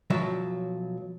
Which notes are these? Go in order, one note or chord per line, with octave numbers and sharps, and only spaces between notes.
B1 F3 F#3 E5